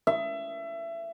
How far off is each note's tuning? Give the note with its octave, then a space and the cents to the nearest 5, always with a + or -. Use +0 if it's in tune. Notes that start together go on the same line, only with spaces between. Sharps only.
E5 +25